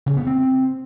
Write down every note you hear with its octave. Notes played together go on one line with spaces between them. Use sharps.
C#3
B3
C4